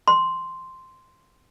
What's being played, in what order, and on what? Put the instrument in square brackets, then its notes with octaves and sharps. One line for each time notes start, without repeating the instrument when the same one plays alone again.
[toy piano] C6